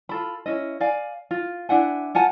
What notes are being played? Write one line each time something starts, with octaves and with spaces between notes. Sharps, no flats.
F4 A4 B5
C#4 E4 D#5
D5 F5 G#5
F4
D4 E4 F#5 G#5
F4 F#5 G#5 A5